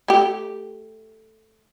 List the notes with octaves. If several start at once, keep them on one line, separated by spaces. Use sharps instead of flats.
A3 G4